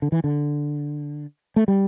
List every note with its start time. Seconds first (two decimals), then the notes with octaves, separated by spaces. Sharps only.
0.02 D3
0.12 E3
0.24 D3
1.56 A3
1.68 G3